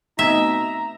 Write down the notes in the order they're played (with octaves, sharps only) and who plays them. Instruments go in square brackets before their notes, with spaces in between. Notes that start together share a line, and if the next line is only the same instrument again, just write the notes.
[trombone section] B2 D#4 [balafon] A3 B3 C4 [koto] E5 [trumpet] A#5